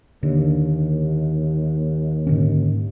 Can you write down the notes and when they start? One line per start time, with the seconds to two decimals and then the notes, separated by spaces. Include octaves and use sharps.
0.23 D#2 D3
2.27 G#2 D3 C#4